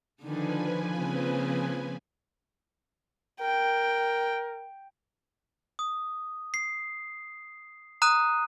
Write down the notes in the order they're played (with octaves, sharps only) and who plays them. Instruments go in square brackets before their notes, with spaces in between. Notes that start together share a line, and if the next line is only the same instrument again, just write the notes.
[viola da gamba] D3 D#3 D4 [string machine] F3 B4 G#5
[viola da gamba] C#3 A#3 C4
[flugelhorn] A#4 [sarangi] G5
[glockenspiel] D#6
C7
A#5 D#6 F#6 D#7